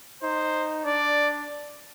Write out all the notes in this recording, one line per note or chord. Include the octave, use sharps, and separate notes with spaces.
D#4 C5
D4 D5